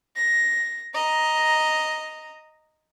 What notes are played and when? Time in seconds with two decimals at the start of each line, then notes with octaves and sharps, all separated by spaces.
0.16 A#6
0.94 D#5 A#5